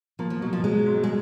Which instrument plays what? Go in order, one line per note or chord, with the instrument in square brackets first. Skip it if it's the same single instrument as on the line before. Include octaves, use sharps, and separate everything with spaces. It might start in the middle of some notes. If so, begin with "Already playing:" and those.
[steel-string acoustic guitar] F3 [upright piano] A#3
[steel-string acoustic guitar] F3
[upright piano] B2 [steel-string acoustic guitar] F#3
[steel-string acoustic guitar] F3
[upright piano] F#3 [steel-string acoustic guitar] G#3
[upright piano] G#2
[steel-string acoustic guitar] G#3